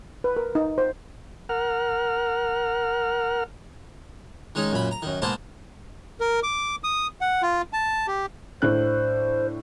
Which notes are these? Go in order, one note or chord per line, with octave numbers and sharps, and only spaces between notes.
B4
A#4
D#4
C5
A#4 F#5 F6
D#3 G#3 C#4 D#4
F#2 A#2 B5
A#5
F#2 D#3
G#2 B2 A#3 C5 A5
A#4
D6
D#6
F#5
F4
A5
G4
A2 D4 C5 F#6